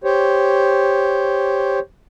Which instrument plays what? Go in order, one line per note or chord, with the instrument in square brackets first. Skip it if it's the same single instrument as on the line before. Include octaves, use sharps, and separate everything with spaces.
[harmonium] G4 C5 C#5